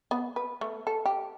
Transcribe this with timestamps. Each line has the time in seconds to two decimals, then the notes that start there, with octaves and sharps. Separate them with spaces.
0.11 B3
0.36 B4
0.61 A3
0.87 A4
1.06 G4